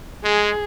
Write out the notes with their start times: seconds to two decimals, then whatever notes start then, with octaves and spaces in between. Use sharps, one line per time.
0.24 G#3 G#4